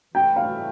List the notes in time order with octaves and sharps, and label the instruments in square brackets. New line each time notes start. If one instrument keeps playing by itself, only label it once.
[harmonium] E3 A3 E4 [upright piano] G5
[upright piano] F5